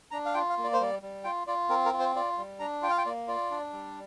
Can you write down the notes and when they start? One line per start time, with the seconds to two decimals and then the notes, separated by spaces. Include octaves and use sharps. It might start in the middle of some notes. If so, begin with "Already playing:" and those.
0.11 D4 A#5
0.25 F5
0.34 F4 G5
0.50 F5
0.58 A#3
0.64 D5
0.73 C5
0.80 G3 D5
1.02 G3
1.24 F4 G5
1.47 F4 D5
1.69 C4 A#4
1.86 A#4
1.93 F4
2.00 C5
2.16 F4 D5
2.38 G3
2.60 D4 A#5
2.82 F4 G5
2.90 F5
2.98 G5
3.06 A#3 D5
3.28 F4 D5
3.51 D4
3.73 G3